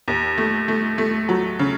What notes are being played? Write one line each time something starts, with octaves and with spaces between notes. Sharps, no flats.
D#2
A3
A3
A3
F#3
C#3